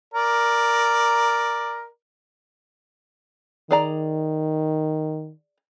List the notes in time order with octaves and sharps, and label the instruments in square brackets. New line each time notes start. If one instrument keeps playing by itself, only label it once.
[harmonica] A#4 D5
[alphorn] D#3 [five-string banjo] G#4 D5 A#5